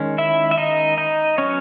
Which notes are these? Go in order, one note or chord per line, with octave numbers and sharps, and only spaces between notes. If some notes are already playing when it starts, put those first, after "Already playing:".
Already playing: D#3 G#3 C#4
E4 E5
E5
D#4 D#5
D#4 D#5
F#3 B3 C#4 C#5